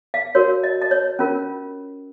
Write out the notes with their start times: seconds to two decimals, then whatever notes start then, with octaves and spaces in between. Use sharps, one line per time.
0.14 F5
0.35 F#4 A#4 C#5
0.63 D#5
0.82 D#5
0.91 C#5
1.19 C#4 F4 A#4